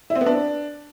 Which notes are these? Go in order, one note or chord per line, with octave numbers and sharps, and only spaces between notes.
E4
C4
B3
D4